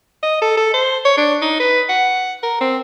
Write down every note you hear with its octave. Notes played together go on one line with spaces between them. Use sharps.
D#5
A4
A4
C5
C#5
D4
D#4
B4
F#5
A#4
C4